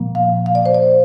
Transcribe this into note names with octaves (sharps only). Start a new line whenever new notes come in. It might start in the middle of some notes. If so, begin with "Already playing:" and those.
Already playing: A#2 F3 A#3
F5
F5
D5
C5
D5